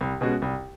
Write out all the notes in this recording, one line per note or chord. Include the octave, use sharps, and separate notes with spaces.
C2
B2 G#3 C#4 F#4
C2